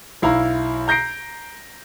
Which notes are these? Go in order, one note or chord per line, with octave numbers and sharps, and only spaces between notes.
B1 E4 F5 A#5
A#5 G6 A#6 C7 D7